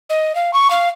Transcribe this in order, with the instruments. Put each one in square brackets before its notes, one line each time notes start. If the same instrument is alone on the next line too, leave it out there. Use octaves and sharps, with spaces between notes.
[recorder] D#5
F5
C#6
F5